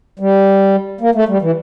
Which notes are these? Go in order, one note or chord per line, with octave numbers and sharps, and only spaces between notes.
G3
A#3
A3
G3
E3